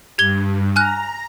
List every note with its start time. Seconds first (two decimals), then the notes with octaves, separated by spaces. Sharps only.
0.18 G2 G4 G#6 G7
0.76 G#5 A#5 F6 F#6